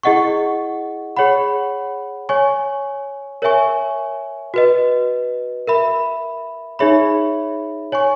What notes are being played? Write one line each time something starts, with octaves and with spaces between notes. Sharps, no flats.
E4 G#4 D#5 F#5 C#6
G#4 C#5 F#5 B5
C#5 G#5 C#6
A#4 C#5 E5 G#5 C#6
F#4 B4 D#5
A#4 E5 B5
D#4 G#4 C#5 E5 B5
C#5 G#5 C#6